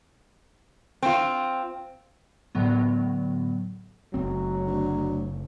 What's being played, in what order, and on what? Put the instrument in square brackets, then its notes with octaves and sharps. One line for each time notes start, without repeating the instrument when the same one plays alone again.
[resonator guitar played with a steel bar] C4 F4
[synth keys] A2 D3 F#3 B3
[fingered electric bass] F#1 C4 [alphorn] F#3
[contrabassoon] D2